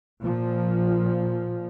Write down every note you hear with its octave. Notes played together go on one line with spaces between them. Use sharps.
A#2 F3